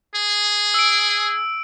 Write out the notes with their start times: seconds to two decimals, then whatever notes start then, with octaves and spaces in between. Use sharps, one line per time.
0.15 G#4
0.74 E6 D7